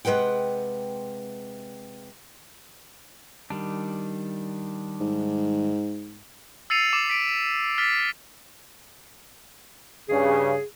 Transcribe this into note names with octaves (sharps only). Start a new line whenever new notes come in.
C3 G#3 B4 F#5 G5
D#3 G3 D4
G#2
E6 A6 C7 C#7 D#7 F7
D6
B6 D7
F6 A6 B6
G2 C#3 G#4